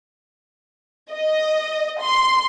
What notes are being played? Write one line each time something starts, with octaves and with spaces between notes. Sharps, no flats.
D#5
C6